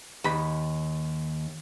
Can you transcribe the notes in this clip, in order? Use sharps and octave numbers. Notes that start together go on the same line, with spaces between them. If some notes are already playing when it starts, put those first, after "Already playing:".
D#2 B5